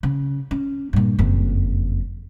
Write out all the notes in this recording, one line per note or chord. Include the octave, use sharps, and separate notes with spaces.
C#3
C#4
G2 A#2
F#1 F2